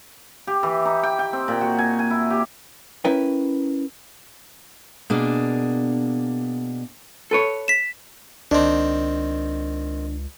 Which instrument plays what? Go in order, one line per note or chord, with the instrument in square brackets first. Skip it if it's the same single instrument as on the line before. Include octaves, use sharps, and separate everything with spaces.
[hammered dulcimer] G4
E3
D#4
G5
G5
C4
A#2
F#4
G#5
G#5
E4
G4
[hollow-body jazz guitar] C#4 E4 A#4 B4 G5
[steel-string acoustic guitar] B2 A#3 D4 G#4
[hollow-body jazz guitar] A4 B4 C#5
[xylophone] B6 E7
[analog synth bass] C#2 [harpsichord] D#3 C4 [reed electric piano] D4